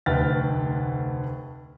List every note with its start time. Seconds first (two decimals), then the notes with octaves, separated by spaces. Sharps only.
0.06 F1 D2 B4 G5 F6 A6